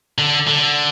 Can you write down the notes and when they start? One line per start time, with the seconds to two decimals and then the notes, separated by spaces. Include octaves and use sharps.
0.18 D3
0.48 D3